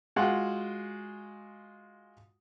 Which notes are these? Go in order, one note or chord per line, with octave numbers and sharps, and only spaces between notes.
G#3 F4 F#4 F#5